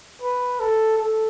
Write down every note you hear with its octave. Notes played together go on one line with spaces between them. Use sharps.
B4
A4
A4